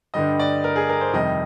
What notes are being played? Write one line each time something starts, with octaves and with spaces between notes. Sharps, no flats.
G2 D3 G3 D#5
D5
A#4
G#4
A#4
C5
F2 C3 D#3 G3 D#5